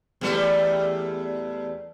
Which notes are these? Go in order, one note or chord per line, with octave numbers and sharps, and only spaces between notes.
E2 G3 A3